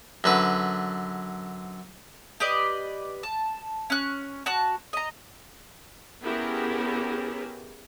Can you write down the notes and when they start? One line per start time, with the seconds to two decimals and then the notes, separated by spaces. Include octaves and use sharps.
0.24 F#2 D3 B4
2.40 G4 B4 D5 D#5
3.23 A5
3.90 C#4 F#6
4.46 F#4 A5 F#6
4.93 D#5 A#5
6.22 B3 C#4 E4 G4 G#4 A#4